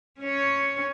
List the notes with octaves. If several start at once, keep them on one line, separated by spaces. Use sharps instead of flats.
C#4 C#5